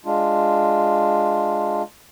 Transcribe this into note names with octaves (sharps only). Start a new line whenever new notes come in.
G#3 D4 F4